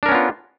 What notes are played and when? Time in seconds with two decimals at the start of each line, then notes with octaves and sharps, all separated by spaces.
0.03 D4
0.06 A#4
0.09 C#4
0.12 B3
0.15 F4